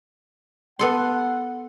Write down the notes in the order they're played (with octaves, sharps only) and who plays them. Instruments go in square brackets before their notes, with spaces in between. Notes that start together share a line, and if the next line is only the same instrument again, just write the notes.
[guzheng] B3 A4 C6 [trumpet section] F#5